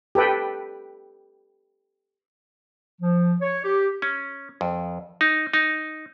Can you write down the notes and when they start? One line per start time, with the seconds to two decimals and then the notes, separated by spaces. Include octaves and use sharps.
0.15 G4 A4 B4 G5
3.01 F3
3.41 C#5
3.64 G4
4.02 C#4
4.61 F2
5.21 D#4
5.54 D#4